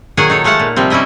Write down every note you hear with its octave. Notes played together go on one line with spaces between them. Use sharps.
A#2 D#3 F#3 G#4 F#5 G#5
D#4 A4 C#5
G#3 A3 F5 F#5 A5
A#2
C3 F3 G3 C4
G3 C#4 E4 D#5 E5